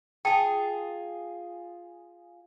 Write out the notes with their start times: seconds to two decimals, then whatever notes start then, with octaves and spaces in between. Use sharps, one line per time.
0.25 F4 G#4 G5 A5